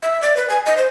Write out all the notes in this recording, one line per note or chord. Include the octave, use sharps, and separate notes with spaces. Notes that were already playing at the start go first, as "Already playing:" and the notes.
E5
D5
B4
G#5
D#5
C5